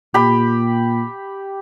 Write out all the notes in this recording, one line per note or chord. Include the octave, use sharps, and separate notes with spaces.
A#2 G4 B5